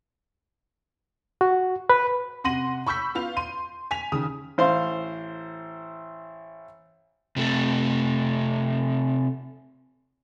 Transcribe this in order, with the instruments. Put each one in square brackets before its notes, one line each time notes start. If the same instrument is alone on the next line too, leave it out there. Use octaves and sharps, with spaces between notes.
[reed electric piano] F#4
B4
[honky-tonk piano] C3 F#5 C6 A#6 D#7 F#7
B5 C#6 E6 G6 B6
B3 F4 F5 F7
C6 D#7
G#5 B6 F7
D#2 C#3 D#6
[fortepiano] A1 C5 F5 C6
[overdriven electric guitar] C3 A3